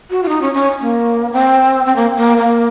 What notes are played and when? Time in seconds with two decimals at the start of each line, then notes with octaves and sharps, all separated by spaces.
0.10 F#4
0.23 F4
0.29 D#4
0.42 C#4
0.54 C#4
0.81 A#3
1.32 C4
1.85 C4
1.96 A#3
2.17 A#3
2.37 A#3